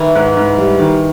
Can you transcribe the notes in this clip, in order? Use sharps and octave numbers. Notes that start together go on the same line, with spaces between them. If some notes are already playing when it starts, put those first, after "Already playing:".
Already playing: D#3 E3
G#2
G#2
G3
D#3